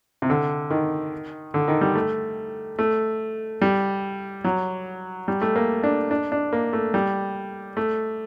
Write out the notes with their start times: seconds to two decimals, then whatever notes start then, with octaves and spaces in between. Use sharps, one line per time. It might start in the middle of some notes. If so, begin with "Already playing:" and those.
0.22 C3
0.30 D3
0.71 D#3
1.54 D3
1.68 D#3
1.81 G3
1.95 A3
2.79 A3
3.62 G3
4.44 F#3
5.28 G3
5.42 A3
5.56 A#3
5.84 D4
6.11 D4
6.32 D4
6.53 A#3
6.73 A3
6.94 G3
7.77 A3